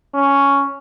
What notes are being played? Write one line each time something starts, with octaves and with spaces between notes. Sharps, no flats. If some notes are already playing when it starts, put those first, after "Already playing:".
C#4